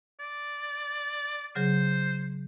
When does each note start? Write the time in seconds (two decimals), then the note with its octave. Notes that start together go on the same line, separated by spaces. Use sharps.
0.19 D5
1.55 C#3 F#3 G#4 C5